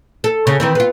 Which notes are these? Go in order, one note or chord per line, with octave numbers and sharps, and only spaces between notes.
A4
C#3 C#4
D#3 E3 C4
B3 F4